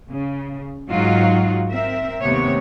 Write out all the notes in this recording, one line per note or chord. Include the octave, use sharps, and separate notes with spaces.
C#3
G#2 F#3 D#4 F4 F#4
C4 A#4 E5
D#2 C3 A3 B3 C#5